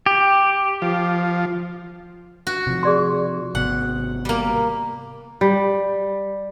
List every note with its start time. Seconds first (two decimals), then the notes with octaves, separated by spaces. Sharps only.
0.06 G4
0.82 F3
2.47 F#4
2.67 C3 F3
2.83 G#4 D5 C6
3.55 G#1 C3 B3 F#5
4.25 G3 A#3
5.41 G3